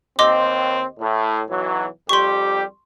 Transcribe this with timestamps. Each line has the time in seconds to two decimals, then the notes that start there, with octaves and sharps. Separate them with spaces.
0.19 D#2 C4 D#5 C6 D6
1.00 A2
1.48 B1 E3 F#3
2.09 F2 G3 G4 C6 C#6